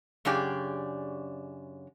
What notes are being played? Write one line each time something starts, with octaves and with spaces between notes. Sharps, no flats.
F#2 C#3 D4 G4 G#4 D5